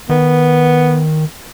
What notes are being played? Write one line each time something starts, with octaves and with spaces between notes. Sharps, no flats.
D#3 B3